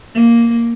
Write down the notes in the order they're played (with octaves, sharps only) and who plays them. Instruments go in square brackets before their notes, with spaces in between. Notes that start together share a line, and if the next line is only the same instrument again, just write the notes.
[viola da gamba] A#3